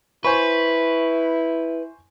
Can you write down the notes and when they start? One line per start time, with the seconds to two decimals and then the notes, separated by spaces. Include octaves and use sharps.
0.25 E4 B4 C5 G#5 C#6